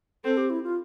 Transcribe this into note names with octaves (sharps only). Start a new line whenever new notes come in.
C4 A4
G4
E4
F4